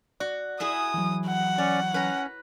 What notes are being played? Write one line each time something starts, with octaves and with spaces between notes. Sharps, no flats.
F#4 D5
E4 G#4 E5 D#6
E3 F#3
F#5
C#4 C#5 D5
C#4 B4 A#5